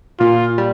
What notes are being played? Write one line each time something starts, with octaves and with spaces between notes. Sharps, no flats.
A#2 F4
G3